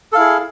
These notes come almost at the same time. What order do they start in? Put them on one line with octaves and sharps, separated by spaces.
A4 F5 E4 G#4